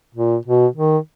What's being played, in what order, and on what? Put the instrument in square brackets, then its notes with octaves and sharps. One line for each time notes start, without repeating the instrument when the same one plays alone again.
[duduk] A#2
B2
D#3